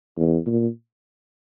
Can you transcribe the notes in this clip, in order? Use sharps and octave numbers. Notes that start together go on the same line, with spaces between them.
E2
A#2